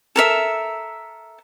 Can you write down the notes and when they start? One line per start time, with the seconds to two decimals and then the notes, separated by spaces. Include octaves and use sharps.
0.16 A4 A#4 E5